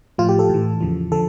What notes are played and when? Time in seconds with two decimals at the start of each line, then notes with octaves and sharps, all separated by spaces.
0.18 A2 F3 F4
0.29 G4
0.39 A4
0.49 A2 E3
0.81 E2 C#3 F3
1.12 D3 F3 A4